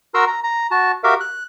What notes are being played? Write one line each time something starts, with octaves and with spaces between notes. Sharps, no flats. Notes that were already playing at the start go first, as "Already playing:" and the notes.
F#4 A#4 A#5 C6 E6
A#5
A#5
F#4 A5
F#4 G4 A#4 E5 F5
F#6